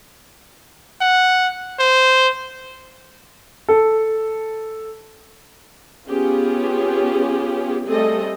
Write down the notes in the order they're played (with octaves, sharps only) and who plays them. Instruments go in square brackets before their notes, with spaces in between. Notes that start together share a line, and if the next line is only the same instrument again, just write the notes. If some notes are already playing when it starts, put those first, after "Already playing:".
[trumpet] F#5
C5
[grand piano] A4
[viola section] B3 C#4 F4 G4 G#4
G3 A3 C4 G#4 A4 D#5